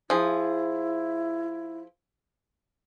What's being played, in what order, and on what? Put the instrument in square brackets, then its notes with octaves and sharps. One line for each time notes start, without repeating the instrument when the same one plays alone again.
[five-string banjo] F3 G#4 [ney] E4